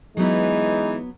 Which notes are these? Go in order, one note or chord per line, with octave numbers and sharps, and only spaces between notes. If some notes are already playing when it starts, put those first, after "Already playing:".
E3 F#3 G#3 B3 D#4